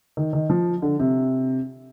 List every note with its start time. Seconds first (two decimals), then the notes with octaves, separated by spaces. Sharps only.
0.17 D#3
0.33 D#3
0.50 F3
0.82 D3
0.99 C3